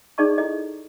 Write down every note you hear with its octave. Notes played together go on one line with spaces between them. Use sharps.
D#4 G#4 D5 D#5 A5 C#6
E4 A4 D#5